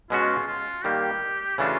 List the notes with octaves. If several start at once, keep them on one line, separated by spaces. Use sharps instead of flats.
B2 G#3 C#4 F4 F#4
F4
D#3 G3 A#3 G4
C#3 E3 A3 D4 F4 F#4